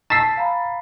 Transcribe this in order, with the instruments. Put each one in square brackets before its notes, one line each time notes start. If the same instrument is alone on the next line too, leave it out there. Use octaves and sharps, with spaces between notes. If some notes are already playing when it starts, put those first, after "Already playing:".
[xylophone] A5 E6 [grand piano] A6 B6 C7
[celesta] F5 A#5 B5